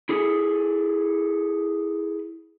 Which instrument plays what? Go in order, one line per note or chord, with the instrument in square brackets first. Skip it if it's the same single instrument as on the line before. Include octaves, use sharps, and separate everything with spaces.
[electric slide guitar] E4 G#4 A4